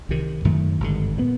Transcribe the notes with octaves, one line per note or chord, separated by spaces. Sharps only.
C2 C3 D#3
F#2 D#3 F#3 A3
G#1 G2 D3
A#2 G3 B3